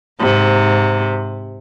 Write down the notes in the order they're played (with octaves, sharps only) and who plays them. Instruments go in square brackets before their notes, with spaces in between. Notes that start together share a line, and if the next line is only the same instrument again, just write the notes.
[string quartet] G#2 C3